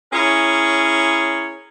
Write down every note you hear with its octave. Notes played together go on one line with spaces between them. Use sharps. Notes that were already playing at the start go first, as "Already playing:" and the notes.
C#4 E4 G#4 A#4 C#5